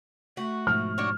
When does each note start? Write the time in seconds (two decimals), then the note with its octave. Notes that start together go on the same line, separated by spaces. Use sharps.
0.37 A3 F#4
0.67 G#2 B2 F3 F6
0.98 D4 F#4 C#5